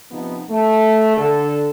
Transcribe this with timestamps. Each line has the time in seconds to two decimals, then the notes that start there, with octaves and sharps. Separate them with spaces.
0.12 C3 F3 B3 D#4
0.50 A3
1.17 D3 A4